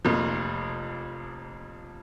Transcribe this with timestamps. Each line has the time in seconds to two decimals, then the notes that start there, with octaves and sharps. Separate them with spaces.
0.05 F1 F2 F3 A#3